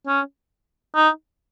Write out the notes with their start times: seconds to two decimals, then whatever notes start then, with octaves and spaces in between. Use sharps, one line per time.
0.07 C#4
0.96 D#4